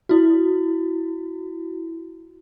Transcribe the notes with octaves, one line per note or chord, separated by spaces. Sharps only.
E4 F#4